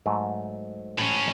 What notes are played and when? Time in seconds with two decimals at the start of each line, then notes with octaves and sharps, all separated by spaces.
0.06 G#2 F#3 A3
0.98 A2 C#4